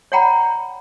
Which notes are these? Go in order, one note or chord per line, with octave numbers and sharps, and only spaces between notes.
C#5 D5 F#5 G5 A#5 B5